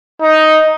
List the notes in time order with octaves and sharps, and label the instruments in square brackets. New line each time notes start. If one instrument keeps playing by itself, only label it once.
[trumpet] D#4